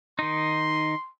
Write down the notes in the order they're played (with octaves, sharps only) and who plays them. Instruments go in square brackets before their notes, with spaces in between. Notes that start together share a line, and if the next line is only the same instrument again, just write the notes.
[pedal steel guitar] D#3 D#4 [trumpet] C6